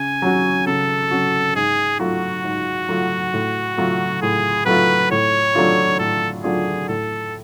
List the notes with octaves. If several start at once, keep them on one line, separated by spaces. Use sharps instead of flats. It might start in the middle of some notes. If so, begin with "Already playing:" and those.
Already playing: C#3 G#5
F#3 C#4 F#4
C#3 A4
F#3 C#4 F#4
G#2 G#4
F#3 A3 F4 F#4
G#2
F#3 A3 F4
A2
F#3 A3 F4
A2 G#4
F#3 A3 F4 B4
A2 C#5
F#3 A3 D4 F4
A2 A4
F#3 A3 D4 F4 G#4
A2 A4